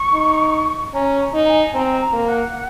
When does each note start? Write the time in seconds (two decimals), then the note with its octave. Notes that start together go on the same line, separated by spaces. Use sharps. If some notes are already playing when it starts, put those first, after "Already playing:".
Already playing: C#6
0.13 D#4
0.94 C#4 A#5
1.21 A#5
1.34 D#4
1.48 G#5
1.74 C4 A#5
2.01 A#5
2.13 A#3
2.27 F#5